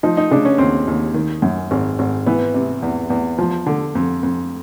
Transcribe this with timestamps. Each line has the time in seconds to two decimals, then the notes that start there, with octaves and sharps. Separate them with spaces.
0.03 F3 D#4
0.17 D#4
0.31 C#3 D4
0.45 C#4
0.58 D#2 C4
0.87 D#2
1.14 D#3
1.42 F#2
1.71 G#1
1.99 G#1
2.26 E3 B3
2.54 C3
2.83 E2
3.10 E2
3.38 F3
3.66 D3
3.95 F2
4.23 F2